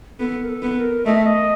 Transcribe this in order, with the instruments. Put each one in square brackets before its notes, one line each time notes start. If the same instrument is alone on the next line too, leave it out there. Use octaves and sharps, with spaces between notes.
[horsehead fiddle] B3 [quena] A4
[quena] A#4
A4
[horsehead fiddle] B3
[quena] A#4
[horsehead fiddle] A3 [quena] D#5
[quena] E5
D#5